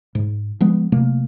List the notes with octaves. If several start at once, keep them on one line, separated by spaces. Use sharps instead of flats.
G#2
F3 G#3 B3
C3 F#3 A3 A#3